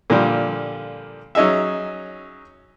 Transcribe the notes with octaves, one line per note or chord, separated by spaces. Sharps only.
A#2 D3 F3 G3
F#3 C#4 D#4 G#4 E5